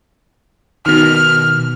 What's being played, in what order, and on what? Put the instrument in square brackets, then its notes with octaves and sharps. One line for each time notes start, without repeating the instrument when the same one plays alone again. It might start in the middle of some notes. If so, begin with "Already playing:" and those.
[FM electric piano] B2 D#3 [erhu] F6